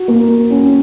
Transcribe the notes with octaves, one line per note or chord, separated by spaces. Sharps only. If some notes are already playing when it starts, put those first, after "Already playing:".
Already playing: F#4
A#3
C#4